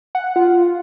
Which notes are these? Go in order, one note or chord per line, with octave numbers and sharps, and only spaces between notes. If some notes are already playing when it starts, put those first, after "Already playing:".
F#5
F4